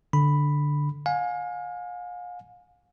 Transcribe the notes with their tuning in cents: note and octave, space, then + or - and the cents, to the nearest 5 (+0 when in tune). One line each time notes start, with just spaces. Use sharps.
D3 +0 B5 +0
F5 +40 G#5 +0